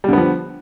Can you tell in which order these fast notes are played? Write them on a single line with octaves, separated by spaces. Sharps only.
G3 D3 B3 F3